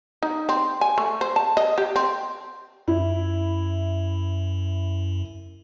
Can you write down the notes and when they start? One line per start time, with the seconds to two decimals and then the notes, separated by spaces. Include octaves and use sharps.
0.23 D#4
0.49 C4
0.81 G#5
0.98 A3
1.21 C5
1.36 A5
1.57 D#5
1.78 G4
1.96 C4
2.88 F#2 E4